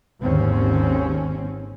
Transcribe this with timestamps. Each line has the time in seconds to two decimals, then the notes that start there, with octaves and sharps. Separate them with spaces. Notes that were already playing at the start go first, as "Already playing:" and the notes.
0.20 G#1 D#2 D3 C4 C#4